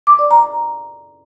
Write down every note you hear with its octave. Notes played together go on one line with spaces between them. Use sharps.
D6
D5
A#5